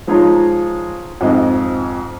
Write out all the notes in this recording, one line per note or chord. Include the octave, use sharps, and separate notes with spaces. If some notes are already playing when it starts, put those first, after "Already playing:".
F3 G#3 D#4 F4 C#5 A#5
F2 G#2 D#5